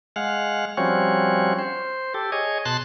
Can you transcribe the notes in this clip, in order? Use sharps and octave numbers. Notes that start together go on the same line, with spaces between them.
G#3 F5 F#5
F3 G3 C4 C#4 F#4 C#5
C5
G4 A4
G#4 C#5 D#5
B2 A5 C6 F#6